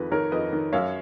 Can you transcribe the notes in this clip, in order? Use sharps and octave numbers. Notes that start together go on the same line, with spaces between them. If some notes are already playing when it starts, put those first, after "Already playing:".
Already playing: F2 D#3 B4
D#3 A#4 C#5
F2 B4 D#5
D#3
F#2 C#5 F5